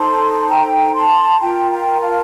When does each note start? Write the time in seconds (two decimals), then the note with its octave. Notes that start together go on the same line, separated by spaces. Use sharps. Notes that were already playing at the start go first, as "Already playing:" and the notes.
Already playing: D#4 A4 C5 A5 C6
0.48 G5 A#5
0.94 A5 C6
1.40 F4 A#4 G5 A#5
1.71 G5 A#5
2.01 F5 A5